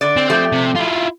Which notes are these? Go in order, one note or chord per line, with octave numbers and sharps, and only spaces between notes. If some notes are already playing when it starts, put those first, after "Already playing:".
D3 D5
C4
F3 A3 G4
C3
E4 F4